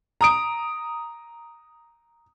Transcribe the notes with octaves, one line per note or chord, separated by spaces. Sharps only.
A#5 D#6 D7